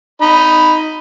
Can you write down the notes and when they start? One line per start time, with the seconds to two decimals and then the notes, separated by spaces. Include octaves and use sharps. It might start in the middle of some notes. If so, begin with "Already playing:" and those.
0.21 D#4 B5